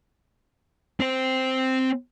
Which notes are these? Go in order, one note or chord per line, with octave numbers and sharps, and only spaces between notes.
C4 C5